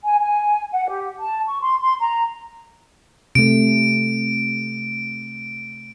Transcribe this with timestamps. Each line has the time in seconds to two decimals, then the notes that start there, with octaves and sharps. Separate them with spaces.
0.04 G#5
0.20 G#5
0.72 F#5
0.88 G4
1.20 A5
1.48 C#6
1.61 C6
1.81 C6
2.00 A#5
3.35 C3 A3 D7